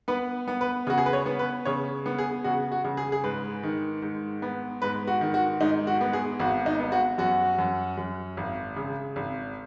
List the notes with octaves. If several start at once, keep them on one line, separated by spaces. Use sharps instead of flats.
B3 B4
B3
B4
C#3 F#4
G#4
B4
C#5
B3
B4
C#3 C#5
B3
G#4
C#3 F#4
F#4
C#3
G#4
G#4
G#2 B4
D#3
G#2
B3
G#2 B4
F#4
D#3
F#4
G#2 D#4
F#4
B3
G#4
G#1 F#4
D#4
B3
F#4
F#2 F#4
F#2
F#2
G#1
C#3
G#1